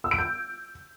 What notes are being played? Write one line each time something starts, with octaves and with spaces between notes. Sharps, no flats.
E6
D7
G6